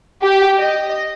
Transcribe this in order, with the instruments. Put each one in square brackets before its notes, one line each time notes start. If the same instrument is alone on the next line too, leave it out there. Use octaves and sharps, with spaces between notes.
[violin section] G4
D#5